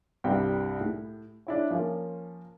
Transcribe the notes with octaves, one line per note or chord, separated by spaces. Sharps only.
C2 G2 G3 C4 F5 G5
A2
D4 E4 C#5
F3 A#3 C#4 F4